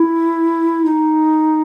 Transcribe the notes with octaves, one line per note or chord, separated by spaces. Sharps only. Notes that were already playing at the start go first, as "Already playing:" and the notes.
Already playing: E4
D#4